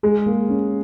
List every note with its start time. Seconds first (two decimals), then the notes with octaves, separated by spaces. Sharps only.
0.03 G#3 G#4
0.26 A#3
0.49 C#4